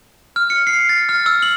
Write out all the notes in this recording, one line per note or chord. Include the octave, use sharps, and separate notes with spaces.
F6
C#7
C7
A6
F6
E6
F#7